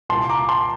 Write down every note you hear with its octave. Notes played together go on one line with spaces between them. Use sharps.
C2 A#2 A5 C6
A#5 D6
A5 C6